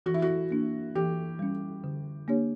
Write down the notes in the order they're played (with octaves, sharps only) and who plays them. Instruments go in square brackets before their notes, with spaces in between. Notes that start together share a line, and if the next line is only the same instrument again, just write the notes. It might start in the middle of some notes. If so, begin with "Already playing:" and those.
[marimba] E3 [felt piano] F#4
[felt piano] E4
F#4
[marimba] A#3 D4
[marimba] E3 [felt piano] G4
[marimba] G3 C#4
D3
A#3 D4 G4 C#5